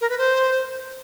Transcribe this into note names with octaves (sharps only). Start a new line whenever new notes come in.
A#4
B4
C5